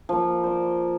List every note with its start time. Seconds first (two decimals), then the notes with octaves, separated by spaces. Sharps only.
0.09 F3 A#3
0.44 C5 D5